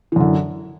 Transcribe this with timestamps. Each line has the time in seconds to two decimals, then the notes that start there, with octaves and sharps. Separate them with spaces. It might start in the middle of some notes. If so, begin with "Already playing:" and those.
0.12 E3
0.16 F#2
0.20 D3